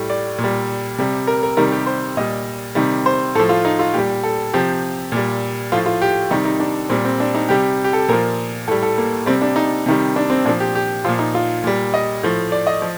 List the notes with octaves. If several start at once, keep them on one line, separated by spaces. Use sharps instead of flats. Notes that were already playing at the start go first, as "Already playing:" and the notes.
Already playing: A2 G3
D5
A#2
G3
C3 G3
A#4
A#4
C3 D#3 G3 A#4
G4
C5
A#2 G3 D#5
C3 D#3 G3
C5
A2 F3 A4
F4
D#4
F4
A#2 G3 G4
A4
C3 F3 G4
A#2 G3
A2 F3 F4
F4
G4
C3 D#3 G3 D#4
D#4
D4
A#2 G3 C4
C4
D4
D#4
C3 G3 G4
G4
A4
A#2 F3 A#4
A2 G3 A4
A4
A#3
C3 G3 C4
D4
D#4
C3 D#3 G3
D4
C4
A#2 F3 D4
G4
G4
A#2 F3 F4
D#4
F4
A#2 G3
D#5
A2 F3
D5
D#5
F3